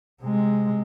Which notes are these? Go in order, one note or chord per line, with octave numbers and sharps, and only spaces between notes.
C3 G#3